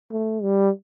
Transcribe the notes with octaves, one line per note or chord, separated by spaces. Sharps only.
A3
G3